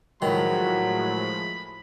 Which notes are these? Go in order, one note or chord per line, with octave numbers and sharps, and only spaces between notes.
A2 D#3 F3 F#3 G#3 B5